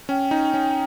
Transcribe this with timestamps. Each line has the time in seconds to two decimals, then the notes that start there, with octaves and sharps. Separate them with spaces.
0.09 C#4 G5
0.31 D#4
0.54 C#4